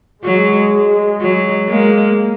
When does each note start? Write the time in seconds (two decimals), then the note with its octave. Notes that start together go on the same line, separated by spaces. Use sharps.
0.24 F#3 G#3
1.21 F#3
1.69 G#3 A#3